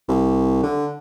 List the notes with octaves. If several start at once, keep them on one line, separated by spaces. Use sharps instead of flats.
C2
D3